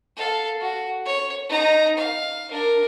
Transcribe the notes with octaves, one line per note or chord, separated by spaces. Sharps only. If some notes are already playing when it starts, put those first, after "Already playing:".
A4 F5
F#4
C#5
D#4 A#5
F5
D4 A#4